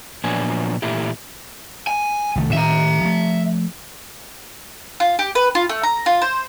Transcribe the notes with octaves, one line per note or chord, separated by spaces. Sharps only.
A#2 F3 F#3 B3 D4 G#5
A#2 E3 A3 E4 G4
G#5
C2 D#3 A3
A2 D#3 C#4 E5 A#5
F3 A3
F4
G4
B4
F4
A3
A#5
F4
C5